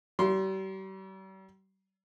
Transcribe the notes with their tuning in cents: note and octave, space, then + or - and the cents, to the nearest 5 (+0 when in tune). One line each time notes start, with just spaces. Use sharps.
G3 -40 C6 +0